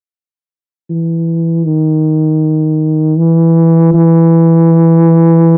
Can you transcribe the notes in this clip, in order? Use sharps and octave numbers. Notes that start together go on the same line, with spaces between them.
E3
D#3
E3
E3